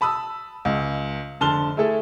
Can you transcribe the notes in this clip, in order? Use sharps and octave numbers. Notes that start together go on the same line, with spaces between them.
A5 B5 D#6 E6
C#2
F1 D3 A5 C6 F6 G7
A3 E4 G#4 A4